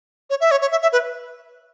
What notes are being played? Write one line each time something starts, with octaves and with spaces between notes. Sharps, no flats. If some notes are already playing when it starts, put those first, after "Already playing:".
C#5
E5
C#5
C#5
E5
E5
B4